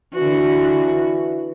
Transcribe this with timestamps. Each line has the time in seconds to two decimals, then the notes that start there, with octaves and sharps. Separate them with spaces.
0.14 D3 E3 F#4